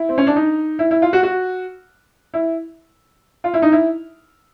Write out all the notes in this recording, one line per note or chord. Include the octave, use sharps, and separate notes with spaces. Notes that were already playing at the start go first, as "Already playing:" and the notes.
Already playing: E4
C4
C#4
D4
D#4
E4
E4
F4
F#4
F#4
E4
F4
E4
D#4
E4